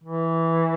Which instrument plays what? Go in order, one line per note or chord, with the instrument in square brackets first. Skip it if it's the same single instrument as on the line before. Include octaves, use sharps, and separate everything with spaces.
[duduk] E3